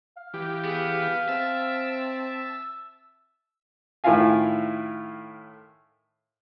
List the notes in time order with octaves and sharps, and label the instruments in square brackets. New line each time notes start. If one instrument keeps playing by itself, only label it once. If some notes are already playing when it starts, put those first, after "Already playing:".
[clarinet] F5
[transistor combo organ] E3 G4
[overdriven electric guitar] B3 [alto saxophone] G#4
[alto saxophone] C4 [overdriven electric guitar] E5 [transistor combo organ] A5
[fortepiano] A2 D#3 E4 F4 F5 G#5